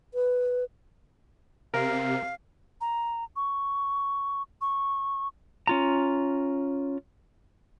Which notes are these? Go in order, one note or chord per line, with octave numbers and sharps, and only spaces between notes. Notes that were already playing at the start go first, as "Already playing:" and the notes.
B4
C3 A#4 F5
A#5
C#6
C#6
C#4 F4 A#5